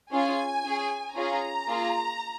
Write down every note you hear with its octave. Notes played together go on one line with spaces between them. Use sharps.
C#4 F4 G#4 G#5
C#4 G#4
C#4 F4 G#4 A#5
A#3 F4 G#4